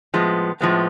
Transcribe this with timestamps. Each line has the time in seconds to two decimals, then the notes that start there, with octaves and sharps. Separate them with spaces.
0.14 A2 F3 G#3 B3
0.61 A2 F3 G#3 B3